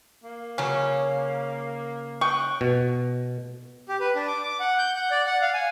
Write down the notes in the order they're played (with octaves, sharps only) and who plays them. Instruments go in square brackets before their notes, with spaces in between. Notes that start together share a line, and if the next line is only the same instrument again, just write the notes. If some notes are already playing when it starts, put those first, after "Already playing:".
[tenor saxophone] A#3
[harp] C#3 [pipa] F#3 C#4
[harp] G5 D#6 F#6 [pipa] C#6
[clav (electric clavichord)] B2
[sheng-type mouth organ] G4
B4
D4
D6
D6
F#5
G6
F#5
D5
F#5
F5
G#5